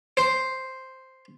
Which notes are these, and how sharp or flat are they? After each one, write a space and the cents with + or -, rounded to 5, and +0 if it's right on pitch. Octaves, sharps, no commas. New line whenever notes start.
C5 +0 C6 +0